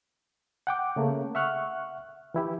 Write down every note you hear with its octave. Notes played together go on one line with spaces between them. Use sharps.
F#5 G5 D6
C#3 A3 A#3
E5 F#5 C#6 F6 F#6
E3 E4 G4